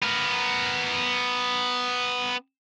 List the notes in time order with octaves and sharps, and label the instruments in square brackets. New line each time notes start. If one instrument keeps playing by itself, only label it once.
[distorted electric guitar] B3 A#4